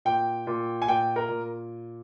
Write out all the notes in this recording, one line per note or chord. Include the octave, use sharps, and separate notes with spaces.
A#2 G5
A#2
G#5
A#2 G5
A#4
A#2